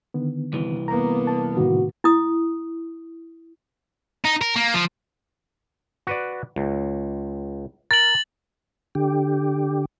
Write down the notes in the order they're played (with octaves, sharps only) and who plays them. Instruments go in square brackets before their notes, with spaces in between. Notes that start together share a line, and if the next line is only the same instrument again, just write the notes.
[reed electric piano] D3 D#3 B3
[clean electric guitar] C2 E3
[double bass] A#3 B3 [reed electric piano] A#5
[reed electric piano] A5
[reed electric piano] A2 C3 D#3 [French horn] F#4
[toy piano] E4 D#6
[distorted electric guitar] D#4
A#4
A#3
F3
[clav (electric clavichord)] F#4 B4 D5
C#2
[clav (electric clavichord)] A#4 [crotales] A6 F#7
[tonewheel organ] D3 G4